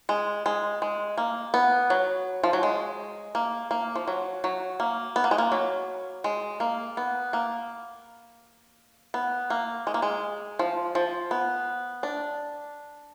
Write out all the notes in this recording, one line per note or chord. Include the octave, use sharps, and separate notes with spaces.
G#3
G#3
G#3
A#3
B3
F#3
F3
F#3
G#3
A#3
A#3
F3
F#3
F#3
A#3
B3
A#3
G#3
A#3
F#3
G#3
A#3
B3
A#3
B3
A#3
G#3
A#3
G#3
F3
F3
B3
D4